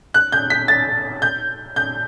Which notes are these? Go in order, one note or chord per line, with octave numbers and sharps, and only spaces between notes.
F#6
G6
B6
A6
G6
G6